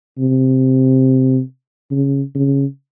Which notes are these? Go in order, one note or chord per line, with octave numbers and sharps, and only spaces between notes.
C3
C#3
C#3